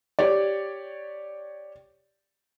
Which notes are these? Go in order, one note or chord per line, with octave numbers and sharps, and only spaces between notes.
G4 C#5 D5